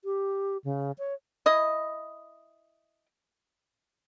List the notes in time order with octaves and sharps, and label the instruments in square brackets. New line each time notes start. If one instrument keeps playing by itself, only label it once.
[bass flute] G4
C#3
C#5
[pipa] E4 D#5